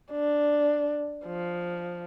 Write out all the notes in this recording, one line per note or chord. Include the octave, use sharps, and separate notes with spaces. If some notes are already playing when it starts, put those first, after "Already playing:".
D4
F3